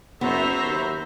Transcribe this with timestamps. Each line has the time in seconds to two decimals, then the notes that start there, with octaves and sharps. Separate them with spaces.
0.21 F#1 B3 F#4 C5 E5 A#5 B5 C#6
0.63 D#2